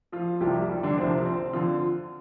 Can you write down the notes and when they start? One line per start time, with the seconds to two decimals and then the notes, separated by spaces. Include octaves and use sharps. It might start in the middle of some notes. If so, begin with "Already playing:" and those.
0.12 F3 F4
0.41 C2 C3 F3 G3 G4
0.69 G3 G4
0.83 D3 D4
0.98 C2 C3 F3 C4
1.26 C4
1.53 D3 F3 F4